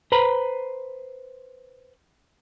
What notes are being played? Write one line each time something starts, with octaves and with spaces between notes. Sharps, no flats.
B4 C5 A#5 B5